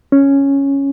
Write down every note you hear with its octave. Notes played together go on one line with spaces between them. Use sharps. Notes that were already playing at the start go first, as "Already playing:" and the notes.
C#4